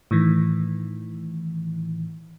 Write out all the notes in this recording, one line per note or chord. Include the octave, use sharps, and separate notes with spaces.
A2 D#3 E3